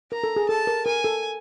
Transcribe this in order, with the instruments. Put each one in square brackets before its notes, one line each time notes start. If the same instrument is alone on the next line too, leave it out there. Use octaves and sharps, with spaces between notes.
[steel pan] A#4 [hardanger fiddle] A#5
[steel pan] A4
G#4
[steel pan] A4 [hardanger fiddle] A5
[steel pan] A#4
[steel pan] A#4 [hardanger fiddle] G#5
[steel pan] A4